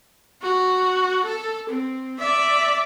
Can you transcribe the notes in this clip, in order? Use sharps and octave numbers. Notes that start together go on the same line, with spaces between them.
F#4
A4
C4
D5 E5